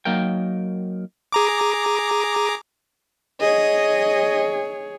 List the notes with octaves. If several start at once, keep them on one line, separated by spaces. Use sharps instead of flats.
F#3 A#3 D#4 A#4 G5
G#4 A#5 D6
G#4 C#5 D#5